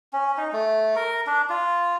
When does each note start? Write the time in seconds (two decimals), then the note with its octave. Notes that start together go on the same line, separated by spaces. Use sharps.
0.13 C#4
0.38 D#4
0.53 A3
0.96 A#4
1.27 D4
1.50 F4